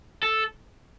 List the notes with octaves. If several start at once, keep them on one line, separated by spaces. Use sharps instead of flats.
A4